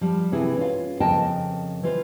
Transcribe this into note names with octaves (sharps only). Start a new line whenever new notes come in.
F3 G3
C3 E3 E4 G#4
C#4 F4
F2 C#3 A#4 D#5 G5 A5
E3 F4 C5